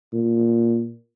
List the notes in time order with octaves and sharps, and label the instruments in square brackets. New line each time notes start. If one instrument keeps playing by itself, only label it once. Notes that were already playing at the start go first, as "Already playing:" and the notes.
[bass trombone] A#2